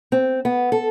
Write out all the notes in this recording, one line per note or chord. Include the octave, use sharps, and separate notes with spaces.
C4
B3
A4